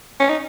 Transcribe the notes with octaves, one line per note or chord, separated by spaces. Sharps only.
C#4
D#4